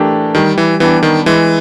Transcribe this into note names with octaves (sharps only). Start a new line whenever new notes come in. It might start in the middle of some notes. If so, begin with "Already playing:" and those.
Already playing: E3 A3 D4 G4 A#4
D#3 G3
E3
E3 B3 D4 G4
D#3
E3 G#3